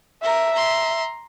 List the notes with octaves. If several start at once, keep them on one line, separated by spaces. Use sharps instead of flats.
A#4 E5
A#5 C6